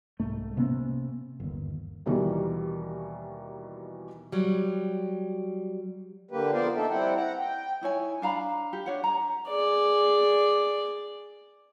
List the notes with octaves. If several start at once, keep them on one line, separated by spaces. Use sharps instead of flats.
C2 G#2 A3
C3 A#3 B3 C#4
G1 D#2
D#2 B2 D#3 E3 G3
F#3 G3
D3 A#3 G4 B4
F2 B3 F4 A#4 C5 D5
A#3 D#4 A4 E5
G3 C4 E4 F#5 G5
F#5 A#5
G5
D#4 E4 C#5 G#5
D4 F5 A#5 B5
G4
D4 C#5 F#5
A#5
G#4 D5